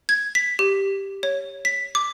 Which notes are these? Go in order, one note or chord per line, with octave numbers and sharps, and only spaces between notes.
G#6
B6
G4
C#5
B6
D6